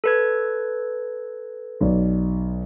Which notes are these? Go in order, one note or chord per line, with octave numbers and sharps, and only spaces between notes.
A4 B4 G#6
B1 D5